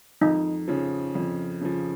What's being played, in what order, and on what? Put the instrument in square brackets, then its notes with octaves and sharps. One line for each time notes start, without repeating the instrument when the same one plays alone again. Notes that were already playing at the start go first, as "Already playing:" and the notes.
[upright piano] F2 [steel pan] D#4
[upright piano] C#3 F3
F2
C#3 F3